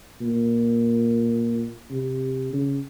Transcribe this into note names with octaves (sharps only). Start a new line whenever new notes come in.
A#2
C3
C#3